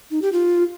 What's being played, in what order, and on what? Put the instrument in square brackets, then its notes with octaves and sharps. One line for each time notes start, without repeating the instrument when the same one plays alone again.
[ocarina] D#4
G4
F4